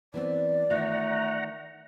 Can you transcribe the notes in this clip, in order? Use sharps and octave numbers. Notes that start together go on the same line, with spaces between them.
E3 B3 C4 D5
D#3 A3 F4 F#5 A#5